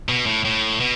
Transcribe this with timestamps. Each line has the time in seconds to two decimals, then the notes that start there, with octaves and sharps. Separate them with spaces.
0.09 B2
0.26 A2
0.45 A2
0.80 B2